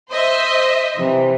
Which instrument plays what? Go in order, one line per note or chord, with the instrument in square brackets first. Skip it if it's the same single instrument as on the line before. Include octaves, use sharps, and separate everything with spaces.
[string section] C5 D#5 E5
[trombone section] C3 [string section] E3